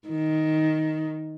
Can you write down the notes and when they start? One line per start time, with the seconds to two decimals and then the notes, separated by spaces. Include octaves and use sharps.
0.08 D#3